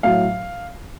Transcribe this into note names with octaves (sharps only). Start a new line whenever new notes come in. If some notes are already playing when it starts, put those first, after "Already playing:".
A2 F#3 F5